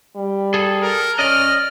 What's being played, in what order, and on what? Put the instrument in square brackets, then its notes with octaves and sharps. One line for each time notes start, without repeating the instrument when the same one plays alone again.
[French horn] G3
[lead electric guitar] G#4 A4
[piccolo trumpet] A#4
[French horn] C#4 [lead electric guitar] D5 D#5 [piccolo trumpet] F6